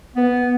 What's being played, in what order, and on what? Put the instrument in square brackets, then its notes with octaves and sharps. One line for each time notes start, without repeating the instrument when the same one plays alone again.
[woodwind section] B3